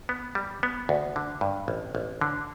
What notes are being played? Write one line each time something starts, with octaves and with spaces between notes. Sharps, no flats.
B3
G3
B3
D2
D3
G2
A1
A1
D3